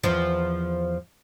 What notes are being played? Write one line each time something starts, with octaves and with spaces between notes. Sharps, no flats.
E2 F3